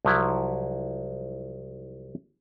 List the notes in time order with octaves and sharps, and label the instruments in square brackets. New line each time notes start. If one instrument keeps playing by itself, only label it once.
[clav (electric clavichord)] C2 F3 F#3 E4